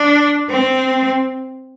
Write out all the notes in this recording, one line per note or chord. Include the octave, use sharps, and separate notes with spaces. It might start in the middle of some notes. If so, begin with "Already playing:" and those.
Already playing: D4
C4